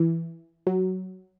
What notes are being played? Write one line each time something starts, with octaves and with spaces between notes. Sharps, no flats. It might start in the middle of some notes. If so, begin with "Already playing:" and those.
Already playing: E3
F#3